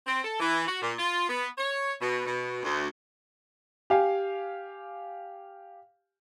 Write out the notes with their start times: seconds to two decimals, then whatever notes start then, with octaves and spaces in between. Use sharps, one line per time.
0.07 C4
0.24 A4
0.40 E3
0.68 F#4
0.82 A#2
0.99 F4
1.29 B3
1.58 C#5
2.01 B2
2.26 B2
2.63 D2
3.90 G4 F5 G#5